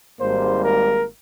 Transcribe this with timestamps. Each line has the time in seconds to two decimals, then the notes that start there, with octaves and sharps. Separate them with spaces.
0.20 G#1 G#2 G3 A#3 C5
0.64 A#4